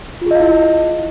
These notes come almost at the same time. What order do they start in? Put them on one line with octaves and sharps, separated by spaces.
F4 G#4 D#5 F5 E4